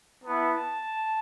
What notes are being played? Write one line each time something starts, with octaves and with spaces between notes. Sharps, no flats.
B3 E4 A5